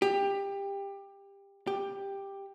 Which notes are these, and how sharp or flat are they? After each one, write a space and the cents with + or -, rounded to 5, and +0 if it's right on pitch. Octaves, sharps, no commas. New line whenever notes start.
G4 +20
G4 +10